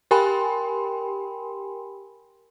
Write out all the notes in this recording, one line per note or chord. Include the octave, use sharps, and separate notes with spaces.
G4 A#4 G5 G#5 B5 C6